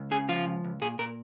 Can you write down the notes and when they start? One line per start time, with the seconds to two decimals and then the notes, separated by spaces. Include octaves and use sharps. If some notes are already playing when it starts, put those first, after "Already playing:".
Already playing: C#2
0.11 C#3 G#4
0.29 F3 F4
0.47 C#2
0.64 C#2
0.81 A#2 G#4
0.99 A#2 A#4